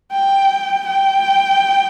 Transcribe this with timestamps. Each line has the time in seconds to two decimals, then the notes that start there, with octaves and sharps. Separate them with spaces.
0.11 G5
0.86 G5